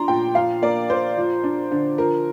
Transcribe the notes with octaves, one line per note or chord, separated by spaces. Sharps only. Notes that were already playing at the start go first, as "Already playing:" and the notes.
Already playing: F3 D4 A#5 C6
A#2 G5
F3 F5
A#3 D5
A#2 C5
F3
D4
D3
F3 A#4